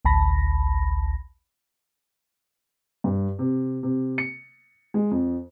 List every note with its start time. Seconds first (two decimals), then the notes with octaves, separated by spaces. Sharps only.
0.05 A1 D2 A5 B5 A#6
3.04 G2
3.39 C3
3.83 C3
4.18 C#7
4.94 G#3
5.11 F2